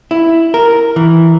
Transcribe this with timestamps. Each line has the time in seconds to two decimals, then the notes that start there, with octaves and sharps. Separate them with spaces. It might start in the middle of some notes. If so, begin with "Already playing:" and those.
0.11 E4
0.54 A#4
0.96 E3